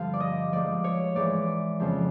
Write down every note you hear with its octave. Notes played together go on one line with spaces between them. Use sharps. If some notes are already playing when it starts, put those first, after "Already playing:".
Already playing: G2 D3 F3 F5
D5
D#5
G#2 F3 D5
C#5
G#2 E3 D5
F2 C#3 F3